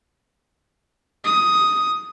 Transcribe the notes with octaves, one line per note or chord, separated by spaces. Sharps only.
D#6